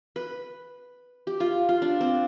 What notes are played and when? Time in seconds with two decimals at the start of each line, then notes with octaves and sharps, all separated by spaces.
0.16 B4
1.27 G4
1.40 F4
1.69 F4
1.82 D4
2.01 C4